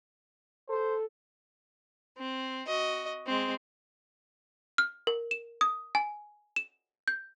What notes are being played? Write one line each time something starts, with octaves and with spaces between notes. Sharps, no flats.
A4 C5
C4
F#4 D#5
G#3 C4
F6
A#4
E7
D#6
G#5
E7
G6